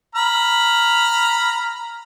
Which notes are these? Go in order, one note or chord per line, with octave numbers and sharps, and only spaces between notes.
A#5 B5 F6